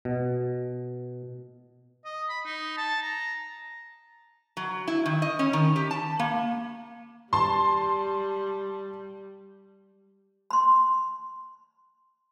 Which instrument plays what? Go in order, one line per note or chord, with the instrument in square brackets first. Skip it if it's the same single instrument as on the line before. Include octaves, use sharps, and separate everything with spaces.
[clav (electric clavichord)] B2
[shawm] D#5
B5
D#4
A5
A#5
[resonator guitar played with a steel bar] F#3
E4
D#3
D#5
C#4
D#3
G4
A5
A#3
[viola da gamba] G3 [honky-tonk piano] A5 C6
[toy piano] B5 C6